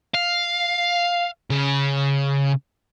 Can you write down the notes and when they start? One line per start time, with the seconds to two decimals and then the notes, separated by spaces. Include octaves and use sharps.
0.14 F5
1.50 C#3